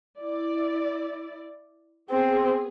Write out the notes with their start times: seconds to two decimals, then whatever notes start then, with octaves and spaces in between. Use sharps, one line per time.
0.19 E4 D5
2.10 B3 C4 G#4